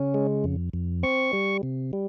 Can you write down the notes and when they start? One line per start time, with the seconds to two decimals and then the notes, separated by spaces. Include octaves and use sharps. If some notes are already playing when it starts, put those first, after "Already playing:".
Already playing: C#3 C#4
0.14 G#3
0.44 F2
0.73 F2
1.03 C4 C#6
1.33 G3
1.63 C3
1.93 G3